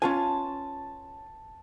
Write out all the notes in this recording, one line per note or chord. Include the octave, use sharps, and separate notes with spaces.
C#4 F4 G#5 A5